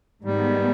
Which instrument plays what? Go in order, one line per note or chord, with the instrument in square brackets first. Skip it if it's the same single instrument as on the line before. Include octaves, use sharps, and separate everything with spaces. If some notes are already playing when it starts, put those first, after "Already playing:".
[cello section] G#2 D#3 G#3 B3 [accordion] G3